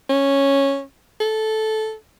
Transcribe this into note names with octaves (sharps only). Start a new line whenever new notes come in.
C#4
A4